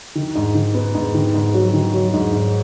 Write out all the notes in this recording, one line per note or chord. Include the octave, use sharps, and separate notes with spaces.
D#3
G#2
D#3
B3
G#2
D#3
G#2
F#3
D#3
F#3
G#2
G#2